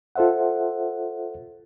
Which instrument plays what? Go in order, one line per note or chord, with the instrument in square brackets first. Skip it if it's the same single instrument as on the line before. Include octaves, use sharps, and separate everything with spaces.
[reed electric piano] F4 A4 C5 E5 F#5